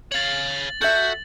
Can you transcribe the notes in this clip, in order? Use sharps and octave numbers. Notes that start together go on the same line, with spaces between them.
C#5 F5 A6 F#7
F#4 A4 E5 G6